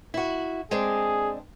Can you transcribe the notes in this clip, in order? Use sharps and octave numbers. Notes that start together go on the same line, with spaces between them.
E4 F#4
G#3 C4 D4 G#4